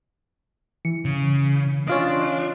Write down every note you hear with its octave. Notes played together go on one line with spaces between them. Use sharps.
E3 C#7
C#3
C#4 D4 F4 D#5